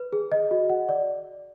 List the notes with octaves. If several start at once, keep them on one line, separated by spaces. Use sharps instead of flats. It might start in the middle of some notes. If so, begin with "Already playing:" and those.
Already playing: B4
G#4
D#5
F#4
F#5
D5